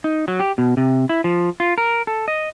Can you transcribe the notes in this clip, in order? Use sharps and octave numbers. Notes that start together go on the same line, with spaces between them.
D#4
F#3
G4
B2
C3
E4
F3
F4
A#4
A4
D#5